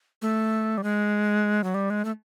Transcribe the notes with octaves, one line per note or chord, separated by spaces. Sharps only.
A3
G3
G#3
F#3
G3
G#3
A3